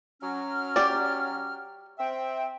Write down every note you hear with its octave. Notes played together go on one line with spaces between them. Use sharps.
F#3 C#4 F6
G4 D5
C4 E5 G5